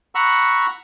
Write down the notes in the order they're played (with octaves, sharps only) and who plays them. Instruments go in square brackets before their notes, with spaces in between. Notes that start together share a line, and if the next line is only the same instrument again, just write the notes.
[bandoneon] F#5 A#5 B5 C#6 E6